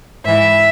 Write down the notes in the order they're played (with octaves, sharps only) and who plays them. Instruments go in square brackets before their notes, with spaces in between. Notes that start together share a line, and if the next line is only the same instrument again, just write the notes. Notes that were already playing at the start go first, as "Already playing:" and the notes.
[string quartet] G#2 E3 E5